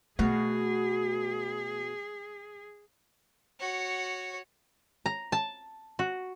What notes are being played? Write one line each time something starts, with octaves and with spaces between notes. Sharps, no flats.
B2 A3 F#4 G#4 F5
F#4 C#5
A#5
A5
F#4